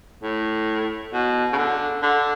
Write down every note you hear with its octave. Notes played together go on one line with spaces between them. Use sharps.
A2
B2
C#3
D3
D3